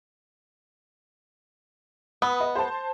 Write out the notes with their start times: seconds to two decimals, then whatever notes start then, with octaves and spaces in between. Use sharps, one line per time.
2.22 B3 B5 D#6
2.40 D#5
2.56 C5 A5